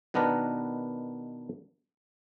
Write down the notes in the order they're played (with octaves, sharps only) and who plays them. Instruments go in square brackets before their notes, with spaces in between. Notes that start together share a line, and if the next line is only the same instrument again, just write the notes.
[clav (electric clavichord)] B2 D#3 B3 D4 A#4 B4